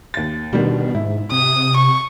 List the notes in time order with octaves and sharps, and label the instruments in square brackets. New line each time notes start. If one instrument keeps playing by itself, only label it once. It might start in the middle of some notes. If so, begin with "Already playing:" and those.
[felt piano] D#2 A6
[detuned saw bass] B2 [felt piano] D3 D#3 G3
[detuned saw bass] G#2 [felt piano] E4
[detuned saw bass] C3 [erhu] D#6
[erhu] C#6